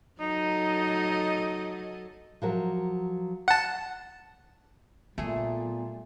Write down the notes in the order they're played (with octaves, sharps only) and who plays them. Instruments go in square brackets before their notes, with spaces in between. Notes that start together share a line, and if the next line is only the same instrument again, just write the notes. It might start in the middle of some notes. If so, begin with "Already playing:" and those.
[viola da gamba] F#3 A4 D#5 [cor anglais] D#4
[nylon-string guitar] F3 F#3 A#4
[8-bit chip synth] F#5 A5
[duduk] A#2 [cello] G3 [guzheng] A3 G#4 [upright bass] B3